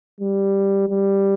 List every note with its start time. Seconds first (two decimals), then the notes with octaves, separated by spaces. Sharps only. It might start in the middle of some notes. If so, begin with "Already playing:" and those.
0.20 G3
0.89 G3